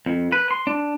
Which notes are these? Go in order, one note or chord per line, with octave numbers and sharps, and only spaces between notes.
F2
B4
C6
D4